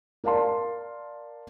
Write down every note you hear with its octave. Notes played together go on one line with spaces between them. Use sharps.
A#4 D5 F5 A5 C6